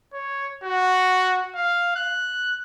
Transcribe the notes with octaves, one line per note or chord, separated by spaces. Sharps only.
C#5
F#4
F5
F#6